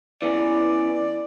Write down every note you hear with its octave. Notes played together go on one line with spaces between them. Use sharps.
E3 B3 C#4 D5